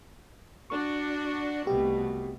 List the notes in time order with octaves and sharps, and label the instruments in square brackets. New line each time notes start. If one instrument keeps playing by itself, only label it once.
[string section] D4 F#4 [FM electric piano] C#6
[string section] C2 B2 A3 [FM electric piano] G4